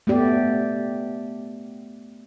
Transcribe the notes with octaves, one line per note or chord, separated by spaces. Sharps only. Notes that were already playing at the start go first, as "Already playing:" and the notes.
A3 B3 G4 D5